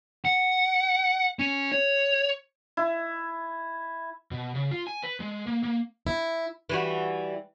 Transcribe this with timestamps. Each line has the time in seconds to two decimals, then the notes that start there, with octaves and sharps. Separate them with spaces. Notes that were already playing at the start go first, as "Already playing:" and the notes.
0.25 F#5
1.39 C#4
1.72 C#5
2.77 E4
4.31 B2
4.55 C#3
4.71 F4
4.87 G#5
5.03 B4
5.20 G#3
5.47 A#3
5.63 A#3
6.07 E4
6.69 E3 G3 F#4